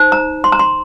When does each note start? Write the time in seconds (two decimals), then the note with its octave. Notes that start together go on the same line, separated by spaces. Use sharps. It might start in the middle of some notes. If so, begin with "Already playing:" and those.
Already playing: D#4 C5
0.12 A#5
0.44 C6
0.52 A#5
0.59 C6